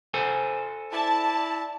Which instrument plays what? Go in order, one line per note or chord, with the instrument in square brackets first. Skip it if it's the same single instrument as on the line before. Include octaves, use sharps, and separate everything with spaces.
[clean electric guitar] A4 C5 G#5
[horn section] E4 D5 [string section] A5